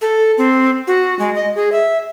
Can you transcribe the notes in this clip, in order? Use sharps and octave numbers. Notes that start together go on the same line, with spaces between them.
A4
C4
F#4
G#3
D#5
G#4
E5